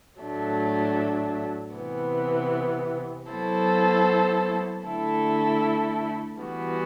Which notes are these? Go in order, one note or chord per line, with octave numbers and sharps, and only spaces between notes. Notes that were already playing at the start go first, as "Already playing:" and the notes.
A2 F#3 A3 D4
C3 E3 B3
F#3 B3 E4 A4 C5
D3 A3 E4 A4
E3 G3 B3 F#4